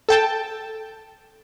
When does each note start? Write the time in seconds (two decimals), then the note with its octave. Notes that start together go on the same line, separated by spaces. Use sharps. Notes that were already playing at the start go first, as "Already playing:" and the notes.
0.09 A4 G5 A5